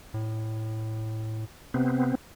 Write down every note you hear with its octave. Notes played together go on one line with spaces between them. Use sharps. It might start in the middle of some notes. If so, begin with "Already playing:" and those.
A2
C3 B3 C4